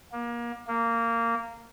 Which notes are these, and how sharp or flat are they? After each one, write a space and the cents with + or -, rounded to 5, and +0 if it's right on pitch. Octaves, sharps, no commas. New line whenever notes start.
A#3 +30
A#3 -15